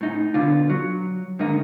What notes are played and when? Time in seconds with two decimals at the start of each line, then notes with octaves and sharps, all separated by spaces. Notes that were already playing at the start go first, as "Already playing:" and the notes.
0.01 A2 D#4
0.34 B2 D3 F4
0.70 F#3
1.39 G#2 D3 D#3 A#3 D#4